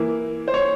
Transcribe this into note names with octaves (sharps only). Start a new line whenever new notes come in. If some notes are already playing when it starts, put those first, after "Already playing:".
Already playing: E3 A#3 E4
C5
C#5